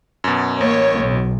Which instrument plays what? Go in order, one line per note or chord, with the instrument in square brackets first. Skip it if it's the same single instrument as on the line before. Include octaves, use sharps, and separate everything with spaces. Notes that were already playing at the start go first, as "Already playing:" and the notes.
[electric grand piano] F#2 B2
[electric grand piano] A1 [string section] A#3 C#5
[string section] B1